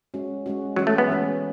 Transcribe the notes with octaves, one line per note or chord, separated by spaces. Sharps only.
G#3 C#4 F#4
G#3 C#4 F#4
E3 F#3 G#3 C#4 G#4
A3
B3
E3 G#3 C#4 G#4